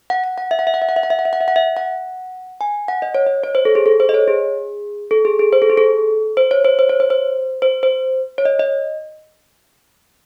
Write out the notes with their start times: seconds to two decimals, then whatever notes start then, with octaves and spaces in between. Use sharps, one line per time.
0.10 F#5
0.24 F#5
0.38 F#5
0.51 E5
0.59 F#5
0.67 E5
0.74 F#5
0.82 E5
0.89 F#5
0.96 E5
1.03 F#5
1.10 E5
1.19 F#5
1.25 E5
1.33 F#5
1.41 E5
1.48 F#5
1.56 E5
1.77 F#5
2.61 G#5
2.88 F#5
3.02 D#5
3.15 C#5
3.26 D#5
3.44 C#5
3.55 C5
3.65 A4
3.75 G#4
3.86 A4
4.00 C5
4.09 D#5
4.14 C#5
4.27 G#4
5.11 A4
5.25 G#4
5.39 G#4
5.53 C5
5.62 A4
5.70 G#4
5.77 A4
6.37 C5
6.51 C#5
6.65 C5
6.79 C5
6.89 C#5
7.00 C5
7.10 C5
7.62 C5
7.83 C5
8.38 C#5
8.45 D#5
8.60 D#5